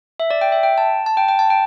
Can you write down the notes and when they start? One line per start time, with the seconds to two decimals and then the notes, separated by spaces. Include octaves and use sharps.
0.20 E5
0.31 D5
0.41 G5
0.52 E5
0.63 G5
0.78 A5
1.06 A5
1.17 G5
1.28 G5
1.39 A5
1.50 G5